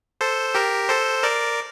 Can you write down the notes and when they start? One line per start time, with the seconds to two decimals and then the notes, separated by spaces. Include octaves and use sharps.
0.21 A4 C5
0.55 G4 A#4
0.89 A4 C5
1.23 A#4 D5